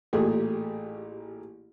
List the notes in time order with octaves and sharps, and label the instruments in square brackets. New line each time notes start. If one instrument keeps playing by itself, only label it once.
[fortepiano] A1 A#2 A3 G4 G#4